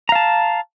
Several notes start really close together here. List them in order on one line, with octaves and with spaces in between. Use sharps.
A#5 F5 A5